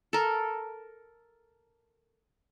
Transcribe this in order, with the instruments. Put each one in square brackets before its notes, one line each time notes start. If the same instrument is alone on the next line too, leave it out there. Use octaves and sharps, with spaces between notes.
[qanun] A4 A#4